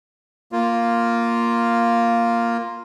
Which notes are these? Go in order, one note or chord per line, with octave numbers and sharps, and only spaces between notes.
A#3 F4